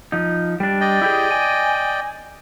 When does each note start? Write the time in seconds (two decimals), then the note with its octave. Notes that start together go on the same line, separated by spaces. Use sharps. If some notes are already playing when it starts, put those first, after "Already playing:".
0.12 F3 D#4
0.60 G3 D4
0.81 D5 D#5 G5
1.02 E4 G4 G#4
1.31 G#5